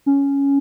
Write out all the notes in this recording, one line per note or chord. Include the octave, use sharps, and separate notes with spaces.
C#4